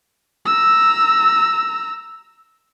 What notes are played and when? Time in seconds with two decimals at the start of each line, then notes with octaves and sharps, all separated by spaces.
0.46 A#5 E6